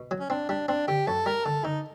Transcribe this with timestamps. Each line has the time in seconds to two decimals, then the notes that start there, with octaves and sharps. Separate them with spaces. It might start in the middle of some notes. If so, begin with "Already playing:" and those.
Already playing: B2
0.11 F#3
0.20 C#4
0.30 C4 D4
0.49 G3 D4
0.69 C4 D4
0.88 D3 G4
1.07 F#2 A4
1.26 G3 A#4
1.45 D3 A4
1.65 D3 D#4